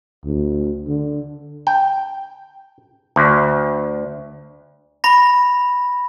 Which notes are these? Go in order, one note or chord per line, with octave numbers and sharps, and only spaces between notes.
D2
D3
G5
D2
B5 A#6